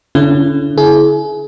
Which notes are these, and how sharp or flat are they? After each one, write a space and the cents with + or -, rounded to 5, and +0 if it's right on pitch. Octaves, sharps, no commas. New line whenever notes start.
D3 -30 C#4 +0 E4 +30
E4 +0 G#4 +30